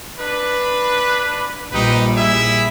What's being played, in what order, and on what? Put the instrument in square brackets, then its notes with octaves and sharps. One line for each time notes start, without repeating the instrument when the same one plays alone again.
[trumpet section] D4 B4
[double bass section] A#1 A#2 G3 [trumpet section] D#4 G4 B4
[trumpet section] E4 G#4 E5